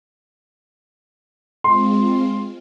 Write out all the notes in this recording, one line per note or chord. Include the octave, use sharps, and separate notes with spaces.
G#3 C4 F4 C6